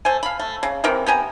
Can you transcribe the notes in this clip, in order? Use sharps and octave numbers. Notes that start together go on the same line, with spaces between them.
A3 C5 G#5
F5 B5
A3
C#3
C3 E3 A#4 G5
B3 G4 G#5 A#5